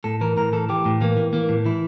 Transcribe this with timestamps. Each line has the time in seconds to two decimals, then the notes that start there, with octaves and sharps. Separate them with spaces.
0.04 A2 A4
0.21 E3 A#4
0.37 A2 A#4
0.53 E3 A4
0.69 E3 G4
0.85 A2
1.01 E3 A#3
1.17 E3
1.33 E3 A#3
1.49 A2
1.65 E3 E4